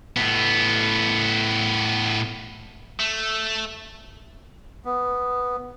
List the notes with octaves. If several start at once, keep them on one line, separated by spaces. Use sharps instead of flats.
A2 B3
A3
B3